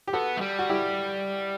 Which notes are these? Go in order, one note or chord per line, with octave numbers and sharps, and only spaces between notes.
G4
B3 F#4 A4
A3
G3
F#4
E4 G4